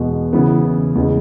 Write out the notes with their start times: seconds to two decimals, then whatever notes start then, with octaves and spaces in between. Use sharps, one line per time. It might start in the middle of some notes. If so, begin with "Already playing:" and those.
Already playing: E2 B2 G#3
0.33 C#3 E3 B3
0.95 E2 C#3 G#3